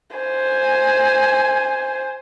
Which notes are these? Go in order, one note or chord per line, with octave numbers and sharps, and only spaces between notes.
C5 G#5